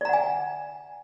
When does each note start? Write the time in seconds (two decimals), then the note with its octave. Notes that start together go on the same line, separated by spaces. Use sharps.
0.01 D5
0.05 A#5
0.09 F#5
0.13 G#5